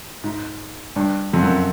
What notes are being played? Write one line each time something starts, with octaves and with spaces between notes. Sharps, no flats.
G#2
G2
F2
F#2